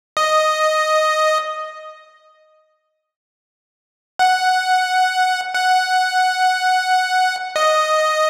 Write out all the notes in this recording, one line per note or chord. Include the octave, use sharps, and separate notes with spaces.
D#5
F#5
F#5
D#5